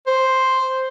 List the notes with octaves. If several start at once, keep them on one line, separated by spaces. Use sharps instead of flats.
C5